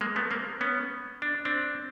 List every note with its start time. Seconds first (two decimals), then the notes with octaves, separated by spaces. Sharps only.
0.01 G#3 A#3
0.16 A3 B3
0.31 A#3 C4
0.61 B3 C#4
1.22 D4
1.45 C4 D4